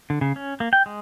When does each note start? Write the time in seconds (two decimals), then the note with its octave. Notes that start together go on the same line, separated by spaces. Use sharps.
0.10 D3
0.21 C#3
0.36 C#4
0.60 A#3
0.73 G5
0.86 G#3